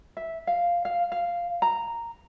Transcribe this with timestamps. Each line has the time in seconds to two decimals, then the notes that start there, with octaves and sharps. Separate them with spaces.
0.17 E5
0.47 F5
0.85 F5
1.12 F5
1.62 A#5